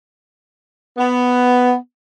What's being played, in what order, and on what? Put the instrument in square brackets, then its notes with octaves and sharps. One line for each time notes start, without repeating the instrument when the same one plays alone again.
[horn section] B3